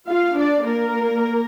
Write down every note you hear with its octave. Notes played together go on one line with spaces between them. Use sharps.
F4 F5
D4 D5
A#3 A#4